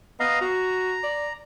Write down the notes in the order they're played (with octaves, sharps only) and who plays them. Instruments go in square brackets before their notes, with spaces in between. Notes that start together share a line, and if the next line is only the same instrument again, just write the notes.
[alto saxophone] B3 [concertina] D#5 F5 A#5
[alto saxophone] F#4 [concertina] A#5
[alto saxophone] D5